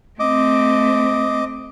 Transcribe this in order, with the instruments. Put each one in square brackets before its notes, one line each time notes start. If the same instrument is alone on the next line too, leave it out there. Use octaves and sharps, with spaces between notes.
[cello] A3 C4 [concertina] D#5 D6